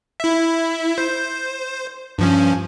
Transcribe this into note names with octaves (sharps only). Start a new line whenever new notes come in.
E4 E5
C5
G2 F3 C#4